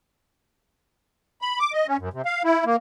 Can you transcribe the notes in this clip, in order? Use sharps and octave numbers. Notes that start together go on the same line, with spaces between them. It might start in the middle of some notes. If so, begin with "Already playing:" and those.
B5
D6
D#5
C#4
F#2
C3
F5
E4
A#3